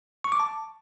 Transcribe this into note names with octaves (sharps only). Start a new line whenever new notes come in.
C#6
D6
A5